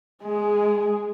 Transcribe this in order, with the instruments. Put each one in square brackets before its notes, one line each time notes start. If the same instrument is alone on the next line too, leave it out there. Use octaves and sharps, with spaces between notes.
[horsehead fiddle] G#3 [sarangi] G#4